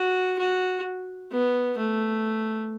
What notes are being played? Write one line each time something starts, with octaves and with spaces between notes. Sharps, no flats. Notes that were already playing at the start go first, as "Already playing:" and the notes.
Already playing: F#4
F#4
B3
A3